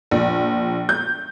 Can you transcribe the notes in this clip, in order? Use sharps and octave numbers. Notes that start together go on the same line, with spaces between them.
A#1
G6